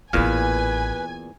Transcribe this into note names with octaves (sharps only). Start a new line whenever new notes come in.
A1 E2 A#2 A#3 B4 F5 G#5